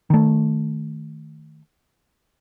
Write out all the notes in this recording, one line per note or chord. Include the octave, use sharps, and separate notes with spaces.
D#3 A3